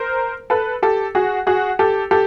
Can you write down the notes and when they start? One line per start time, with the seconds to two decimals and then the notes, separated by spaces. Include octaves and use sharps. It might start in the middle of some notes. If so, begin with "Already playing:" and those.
Already playing: A#4 C5
0.50 A4 B4
0.82 G4 A4
1.15 F#4 G#4
1.47 F#4 G#4
1.79 G4 A4
2.11 G4 A4